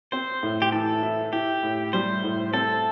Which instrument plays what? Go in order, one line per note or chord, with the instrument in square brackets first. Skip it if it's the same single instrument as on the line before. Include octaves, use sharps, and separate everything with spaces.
[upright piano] C4 [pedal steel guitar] C5
[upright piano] A2
[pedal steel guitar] G4
[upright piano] E3 [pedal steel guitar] A4
[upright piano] E4
[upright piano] E4 [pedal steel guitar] G4
[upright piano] A2
[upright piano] G3 [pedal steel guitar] C5
[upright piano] A2
[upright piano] C4 [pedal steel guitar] A4